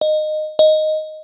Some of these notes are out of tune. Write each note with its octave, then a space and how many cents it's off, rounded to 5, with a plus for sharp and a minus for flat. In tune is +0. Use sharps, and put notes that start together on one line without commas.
D#5 -15
D#5 +0